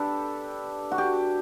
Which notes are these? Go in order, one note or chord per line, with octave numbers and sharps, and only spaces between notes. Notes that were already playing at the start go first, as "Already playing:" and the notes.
Already playing: D4 G4 A4 B4
F#4
G4